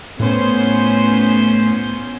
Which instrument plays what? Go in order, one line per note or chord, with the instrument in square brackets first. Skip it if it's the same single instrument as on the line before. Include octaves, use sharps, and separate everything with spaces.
[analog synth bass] A2 [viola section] B3 C#4 C5